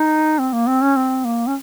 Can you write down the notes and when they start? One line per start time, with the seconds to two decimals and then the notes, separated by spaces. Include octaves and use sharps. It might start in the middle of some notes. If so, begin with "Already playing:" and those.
Already playing: D#4
0.38 C4
0.53 A#3
0.67 C4
0.82 C#4
0.96 C4
1.25 A#3
1.47 C#4